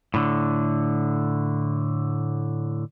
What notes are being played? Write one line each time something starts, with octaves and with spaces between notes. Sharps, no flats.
A2 D3